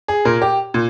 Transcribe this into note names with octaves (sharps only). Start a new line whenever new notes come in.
G#4
A#2 A#4
G4
A#2